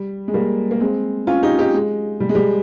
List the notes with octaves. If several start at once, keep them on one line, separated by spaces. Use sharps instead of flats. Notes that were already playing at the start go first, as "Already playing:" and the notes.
Already playing: G3
G#3
G3 A#3
A#3
G#3 C4
C#4 F4
D#4 G4
D#4 G4
G#3
G3
G#3
G3